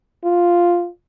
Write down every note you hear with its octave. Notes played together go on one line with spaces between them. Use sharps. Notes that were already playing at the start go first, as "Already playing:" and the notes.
F4